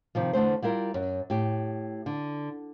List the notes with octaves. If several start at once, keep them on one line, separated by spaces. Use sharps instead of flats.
C3 D#3 F3
E2 D3 A3 C5
G3 E4 F4 A#4
F#2
A2 G4
D3